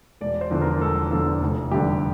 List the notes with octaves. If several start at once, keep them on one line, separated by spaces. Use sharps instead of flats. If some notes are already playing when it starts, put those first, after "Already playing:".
E1 D5
C5
E2 D3 F3
A#4
E1 A4
E2 D3 F3 A4
F1
F2 D3 G3 G4